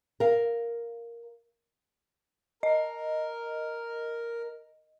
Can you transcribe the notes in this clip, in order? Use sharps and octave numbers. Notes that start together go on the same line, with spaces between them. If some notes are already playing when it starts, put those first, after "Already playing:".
A#4 F5
A#4 D#5